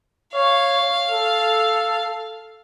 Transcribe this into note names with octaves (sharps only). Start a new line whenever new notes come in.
C#5 F5
A4